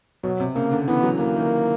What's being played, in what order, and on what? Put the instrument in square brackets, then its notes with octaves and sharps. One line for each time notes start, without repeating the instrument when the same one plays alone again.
[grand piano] B2 [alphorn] F#3
[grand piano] C3
[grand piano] C#3 [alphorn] A#3
[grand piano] D3
[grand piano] E3 [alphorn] B3
[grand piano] F#3
[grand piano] E3 [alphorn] A#3
[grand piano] D#3